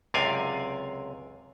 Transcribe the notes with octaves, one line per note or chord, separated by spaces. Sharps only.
C#2 F#2 C3 D5 F5 G#5